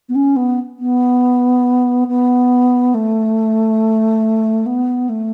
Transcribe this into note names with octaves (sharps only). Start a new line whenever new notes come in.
B3
C#4
B3
B3
B3
A3
B3
A3